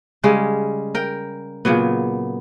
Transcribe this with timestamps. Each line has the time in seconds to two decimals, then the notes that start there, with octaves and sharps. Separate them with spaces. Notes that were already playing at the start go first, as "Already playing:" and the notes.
0.23 C#3 G3 G#3 C#4
0.95 A#4 G5
1.65 A#2 C#3 F#3 B3